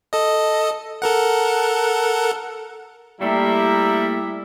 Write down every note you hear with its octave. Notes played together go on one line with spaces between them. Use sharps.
A4 D#5
A4 A#4 F#5
G3 A3 A#3 E4 A4 E5 A#5